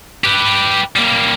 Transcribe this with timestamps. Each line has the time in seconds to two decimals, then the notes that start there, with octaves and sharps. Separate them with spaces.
0.24 G4 B4
0.96 G3 A#3